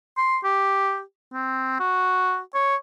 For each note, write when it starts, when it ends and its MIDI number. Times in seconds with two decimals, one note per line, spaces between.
0.17 0.39 84
0.44 1.01 67
1.33 1.78 60
1.80 2.40 66
2.54 2.76 73